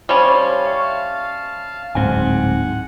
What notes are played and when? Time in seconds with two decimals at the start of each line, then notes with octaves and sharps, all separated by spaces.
0.09 G3 C#4 C5 F5 A5 F6
0.65 E5 C#6
1.95 D1 G#2 C4 F#5 G#5